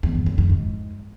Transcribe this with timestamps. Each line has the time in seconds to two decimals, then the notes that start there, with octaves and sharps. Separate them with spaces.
0.03 E2
0.15 G2
0.26 F#2
0.38 F2
0.50 G#2